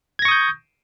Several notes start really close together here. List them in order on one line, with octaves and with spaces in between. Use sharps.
G#6 A#6 C#6 D#6 G6